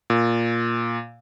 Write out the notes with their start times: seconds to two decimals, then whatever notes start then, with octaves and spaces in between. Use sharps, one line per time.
0.10 A#2